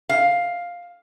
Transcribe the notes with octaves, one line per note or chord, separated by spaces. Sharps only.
F5